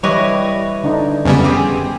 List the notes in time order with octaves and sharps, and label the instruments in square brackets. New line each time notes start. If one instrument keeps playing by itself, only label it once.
[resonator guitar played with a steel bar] E3 B4 D#5 [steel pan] G3 [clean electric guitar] E4 C#5
[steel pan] D3 D4 D#4
[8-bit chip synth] F2 C#3 G3 [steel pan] B3 C#4
[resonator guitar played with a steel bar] C4 G4 G#4